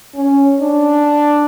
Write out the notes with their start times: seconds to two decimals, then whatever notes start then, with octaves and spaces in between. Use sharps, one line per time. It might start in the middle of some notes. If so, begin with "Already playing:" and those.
0.15 C#4
0.61 D4